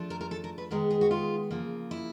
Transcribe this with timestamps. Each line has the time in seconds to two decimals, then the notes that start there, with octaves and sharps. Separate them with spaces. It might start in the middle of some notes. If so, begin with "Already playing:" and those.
Already playing: F3 A3 D4
0.10 A#4
0.21 A#4
0.31 A4
0.44 A#4
0.58 B4
0.70 D#3 G#3 B3 A#4
0.91 G#4
1.01 F#4
1.11 F4
1.50 C#3 F3 A#3
1.91 E4